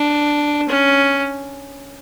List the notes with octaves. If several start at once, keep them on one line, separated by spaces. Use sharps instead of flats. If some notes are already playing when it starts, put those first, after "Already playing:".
Already playing: D4
C#4